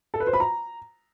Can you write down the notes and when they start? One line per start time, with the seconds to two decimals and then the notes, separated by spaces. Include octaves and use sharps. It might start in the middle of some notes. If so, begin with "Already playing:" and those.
0.14 A4
0.20 B4
0.27 C5
0.33 B5
0.40 A#5